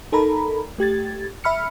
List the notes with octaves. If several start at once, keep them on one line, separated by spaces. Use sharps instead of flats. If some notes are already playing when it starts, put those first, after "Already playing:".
D#4 A4 A#4 A#5 B5
A3 G4 G#6 A6
E5 B5 F6 C#7